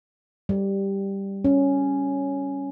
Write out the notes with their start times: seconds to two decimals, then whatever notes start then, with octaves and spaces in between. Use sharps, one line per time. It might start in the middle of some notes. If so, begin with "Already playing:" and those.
0.49 G3
1.45 C#4